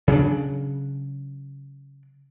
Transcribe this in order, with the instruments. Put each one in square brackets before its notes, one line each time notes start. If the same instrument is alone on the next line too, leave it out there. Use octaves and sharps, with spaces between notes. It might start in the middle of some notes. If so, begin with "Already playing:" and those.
[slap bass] C#3 F#3 C4 D4